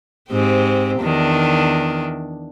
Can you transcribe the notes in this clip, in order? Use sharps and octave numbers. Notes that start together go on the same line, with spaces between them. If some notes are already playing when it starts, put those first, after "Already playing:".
G#2 C4 G4
E2 D#3 D4